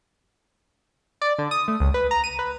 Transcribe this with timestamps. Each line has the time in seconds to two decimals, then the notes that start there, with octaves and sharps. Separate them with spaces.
1.22 D5
1.39 D3
1.51 D#6
1.68 A3
1.80 C#2
1.94 B4
2.11 A#5
2.24 D#7
2.39 B4